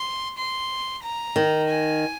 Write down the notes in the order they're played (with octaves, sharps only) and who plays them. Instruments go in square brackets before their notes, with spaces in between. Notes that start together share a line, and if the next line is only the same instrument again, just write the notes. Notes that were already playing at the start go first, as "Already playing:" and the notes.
Already playing: [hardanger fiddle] C6
C6
A#5
[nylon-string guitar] D#3
[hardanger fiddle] G#5